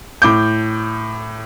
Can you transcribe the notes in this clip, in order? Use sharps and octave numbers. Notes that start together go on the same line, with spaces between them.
A2 D6 G6